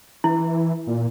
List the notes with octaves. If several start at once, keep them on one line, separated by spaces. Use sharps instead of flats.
E3 E4
A#2